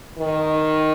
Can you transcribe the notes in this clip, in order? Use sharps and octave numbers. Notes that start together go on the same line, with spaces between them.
D#3